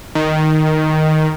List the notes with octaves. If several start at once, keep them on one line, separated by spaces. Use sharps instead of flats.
D#3